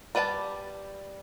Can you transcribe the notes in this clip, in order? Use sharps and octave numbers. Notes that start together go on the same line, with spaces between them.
G3 B4 D5 F5 A5